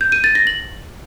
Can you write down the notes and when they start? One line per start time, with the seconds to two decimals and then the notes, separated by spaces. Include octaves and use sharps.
0.01 G6
0.12 D#7
0.24 A6
0.35 A#6
0.47 F#7